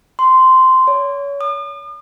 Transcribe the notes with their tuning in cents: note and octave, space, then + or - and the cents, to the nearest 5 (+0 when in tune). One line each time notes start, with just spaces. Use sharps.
C6 -10
C#5 +30
D#6 -45